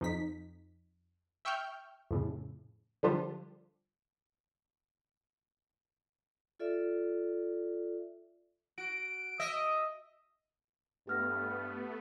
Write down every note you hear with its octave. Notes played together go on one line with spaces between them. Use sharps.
F2 D#4 B6
E5 G5 C#6 E6 F6 G6
F2 A2 C#3
D3 F3 G3 D4 F4 G4
F4 A4 D5 E5
F#4 D7
D#5 E5
G2 A3 B3 G4 F6 A#6